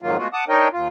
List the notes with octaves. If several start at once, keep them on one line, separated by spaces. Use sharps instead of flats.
F2 G#2 D#3 F#3 A#3 F4
G#3 A3 B3 F4 F#4
F#5 A5 D6 D#6
D4 D#4 A#4 C#5 D#5 G5
D#2 F4